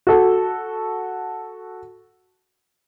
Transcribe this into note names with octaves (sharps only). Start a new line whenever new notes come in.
F#4 A4